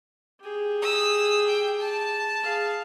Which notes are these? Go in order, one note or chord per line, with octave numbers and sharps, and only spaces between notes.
G4 G#4
D#6 E6
G5
A5
G#4 F5